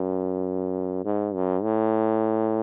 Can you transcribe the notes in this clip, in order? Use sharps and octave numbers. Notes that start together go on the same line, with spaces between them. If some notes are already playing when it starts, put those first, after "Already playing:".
Already playing: F#2
G#2
F#2
A2